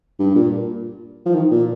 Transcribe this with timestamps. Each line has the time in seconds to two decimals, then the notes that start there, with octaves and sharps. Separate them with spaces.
0.19 G2
0.36 A#2
1.26 F3
1.35 D#3
1.51 A#2